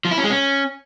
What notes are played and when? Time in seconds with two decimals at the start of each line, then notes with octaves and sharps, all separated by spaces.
0.05 F3
0.11 E4
0.17 C#4
0.24 G#3
0.30 C#4